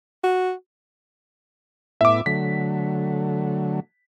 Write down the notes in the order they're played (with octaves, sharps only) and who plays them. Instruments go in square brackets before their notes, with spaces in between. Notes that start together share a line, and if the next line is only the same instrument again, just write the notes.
[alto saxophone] F#4
[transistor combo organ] A2 B3 E4 [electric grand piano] E5 D6
[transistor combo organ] D3 F#3 A3 [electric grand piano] B6